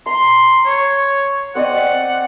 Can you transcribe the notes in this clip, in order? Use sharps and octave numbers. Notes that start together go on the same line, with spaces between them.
A#5 C6
C#5
C4 D5 D#5 F#5